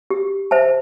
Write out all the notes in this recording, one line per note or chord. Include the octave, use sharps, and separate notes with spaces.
G4
C5 E5 A5